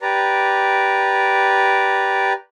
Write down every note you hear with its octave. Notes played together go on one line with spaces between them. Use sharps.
G4 B4 D5 A#5